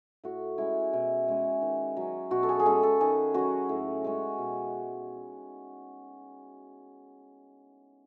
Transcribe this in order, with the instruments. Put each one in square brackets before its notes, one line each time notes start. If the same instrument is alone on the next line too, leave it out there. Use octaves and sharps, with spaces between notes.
[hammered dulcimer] A2 F#4
G#3 C#4 E4
B2 E4
G#3 C#4
D#3
F#3 C#4
B2 F#4
A4
G#4
G#4
G#3 C#4 A4
A4
D#3 G#4
F#3 C#4 F#4
A2
G#3 C#4
B2